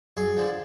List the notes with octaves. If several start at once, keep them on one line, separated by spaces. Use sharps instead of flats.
F#2 G#4
D3 F3